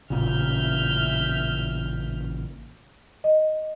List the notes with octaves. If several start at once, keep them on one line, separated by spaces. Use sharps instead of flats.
A1 A#2 C#3 E5 F6 G6
D#5